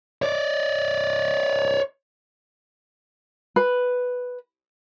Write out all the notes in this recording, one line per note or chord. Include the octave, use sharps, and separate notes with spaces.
C#5 D5
B4